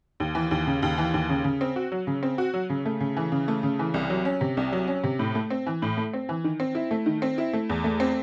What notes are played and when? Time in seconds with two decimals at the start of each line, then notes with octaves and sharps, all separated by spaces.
0.20 D#2
0.35 E3
0.51 D#2
0.67 C#3
0.83 D#2
0.98 E3
1.14 D#2
1.29 C#3
1.44 C#3
1.61 C4
1.76 F#4
1.92 F#3
2.07 C#3
2.23 C4
2.38 F#4
2.54 F#3
2.70 C#3
2.85 A3
3.00 C#3
3.17 E3
3.32 C#3
3.48 A3
3.63 C#3
3.79 E3
3.94 C2
4.10 F#3
4.25 C#4
4.41 C3
4.57 C2
4.72 F#3
4.88 C#4
5.04 C3
5.19 A2
5.35 A3
5.50 C4
5.66 E3
5.82 A2
5.97 A3
6.13 C4
6.29 E3
6.44 D#3
6.60 C4
6.75 E4
6.91 A3
7.06 D#3
7.22 C4
7.38 E4
7.53 A3
7.69 E2
7.84 A3
8.00 C4